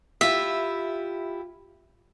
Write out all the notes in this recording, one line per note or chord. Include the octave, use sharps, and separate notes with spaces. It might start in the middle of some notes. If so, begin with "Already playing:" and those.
E4 F4 G4 E5